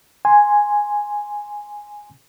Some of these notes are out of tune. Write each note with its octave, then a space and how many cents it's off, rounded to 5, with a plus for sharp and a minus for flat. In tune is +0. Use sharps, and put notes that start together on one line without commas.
G#5 -5 C6 +0